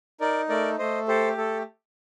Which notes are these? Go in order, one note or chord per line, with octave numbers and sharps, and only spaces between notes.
D#4 A#4 D5
A3 A#4 D5
A3 C5 D#5
G4 A4 C5
A3 A4